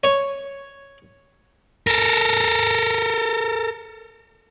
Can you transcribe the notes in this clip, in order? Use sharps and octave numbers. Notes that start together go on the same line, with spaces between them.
C#5
A4 A#4